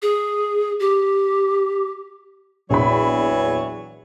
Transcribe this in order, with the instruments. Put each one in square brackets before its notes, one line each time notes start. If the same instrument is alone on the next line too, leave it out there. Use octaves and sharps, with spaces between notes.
[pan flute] G#4
G4
[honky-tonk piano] A#1 E2 B5 [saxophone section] E3 F#3 C#5